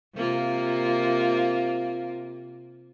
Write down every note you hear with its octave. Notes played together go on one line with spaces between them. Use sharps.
C3 A#3 F4